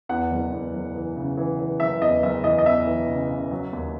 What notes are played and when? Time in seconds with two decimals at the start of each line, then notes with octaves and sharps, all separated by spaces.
0.09 E2 F#5
0.31 F#1
0.52 E2
0.73 F#1
0.95 E3
1.16 C#3
1.37 E3
1.59 E3
1.80 F#1 E5
2.02 E2 D#5
2.23 F#1 E5
2.44 E3 D#5
2.58 D#5
2.65 E2 E5
2.87 E3
3.08 C#3
3.29 C#3
3.51 F#3
3.73 D#2